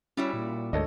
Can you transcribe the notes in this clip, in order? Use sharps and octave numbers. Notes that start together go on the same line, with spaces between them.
G3 C#4 E4 F#4
A#2
D2 G#2 A4 C#5 D#5